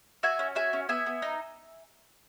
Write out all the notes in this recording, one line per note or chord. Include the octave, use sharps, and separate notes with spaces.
F#4 E5 G#5
C#4
F#4 E5 G#5
C#4
B3 E5 G#5
B3
D#4